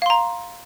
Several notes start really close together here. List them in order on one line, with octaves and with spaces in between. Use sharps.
F5 C6 A#5